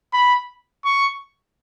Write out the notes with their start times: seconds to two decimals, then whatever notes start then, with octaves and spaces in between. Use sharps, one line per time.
0.13 B5
0.85 C#6